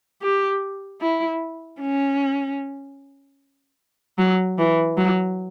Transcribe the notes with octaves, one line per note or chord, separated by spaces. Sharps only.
G4
E4
C#4
F#3
E3
F#3